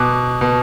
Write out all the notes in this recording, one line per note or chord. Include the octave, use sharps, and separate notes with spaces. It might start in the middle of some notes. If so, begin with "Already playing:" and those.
Already playing: B2 D6 F#6
B2